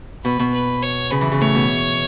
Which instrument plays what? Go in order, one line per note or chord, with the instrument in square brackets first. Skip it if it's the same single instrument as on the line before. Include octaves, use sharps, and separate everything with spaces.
[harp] B2 [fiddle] B4
[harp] B2
[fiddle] B4
C#5
[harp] C#3 [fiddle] B4
[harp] E3
C#3
[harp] A2 [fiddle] C#5
[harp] B2